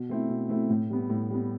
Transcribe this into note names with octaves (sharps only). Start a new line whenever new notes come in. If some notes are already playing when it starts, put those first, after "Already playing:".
Already playing: B2
A3 C4 E4
B2
A3 C4 E4
A2
G3 B3
A2
G3 B3